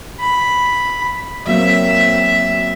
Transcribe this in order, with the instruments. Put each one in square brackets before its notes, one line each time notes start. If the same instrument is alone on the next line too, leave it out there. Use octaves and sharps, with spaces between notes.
[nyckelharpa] B5
[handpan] F#3 A#3 C4 [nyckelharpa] E5